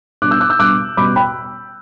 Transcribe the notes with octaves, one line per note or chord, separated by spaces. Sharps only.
B2 G3 B3 D4 D6 F#6
E6 G6
D6 F#6
E6 G6
B2 G3 B3 D4 D6 F#6
B2 G3 C#4 B5 D6
G5 B5